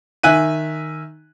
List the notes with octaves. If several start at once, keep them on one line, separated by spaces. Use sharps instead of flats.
D#3 E5 G#5 F#6 D#7